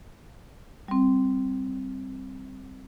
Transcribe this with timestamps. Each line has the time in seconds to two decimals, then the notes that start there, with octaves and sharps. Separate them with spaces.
0.88 G3 C4